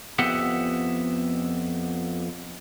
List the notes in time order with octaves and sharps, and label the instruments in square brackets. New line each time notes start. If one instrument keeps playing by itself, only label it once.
[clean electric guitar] F2 B3 G4 E5 F#5